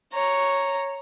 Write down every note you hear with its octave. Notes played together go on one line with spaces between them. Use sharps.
C#5 A#5